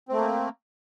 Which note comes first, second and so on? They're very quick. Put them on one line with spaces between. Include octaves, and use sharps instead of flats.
C4 A3 A#3